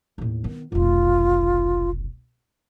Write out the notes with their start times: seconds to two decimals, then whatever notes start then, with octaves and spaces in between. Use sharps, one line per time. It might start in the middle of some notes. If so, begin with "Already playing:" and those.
0.18 D#2 A2
0.44 D#3 B3
0.72 F1 B1 F4